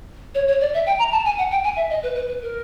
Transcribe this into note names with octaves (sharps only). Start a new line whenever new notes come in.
C#5
C#5
D5
E5
G5
A#5
A5
G#5
F#5
G5
G#5
E5
D#5
B4
B4
B4
A#4